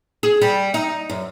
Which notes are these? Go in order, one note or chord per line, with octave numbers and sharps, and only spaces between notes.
G#4
G3
D#4
F#2